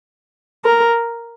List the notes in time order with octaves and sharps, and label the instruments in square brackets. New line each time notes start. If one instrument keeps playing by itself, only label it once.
[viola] A#4